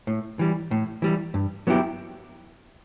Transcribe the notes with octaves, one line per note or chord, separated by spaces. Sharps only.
A2
E3 G3
A2
E3 G3
G2
F#3 B3 E4 G4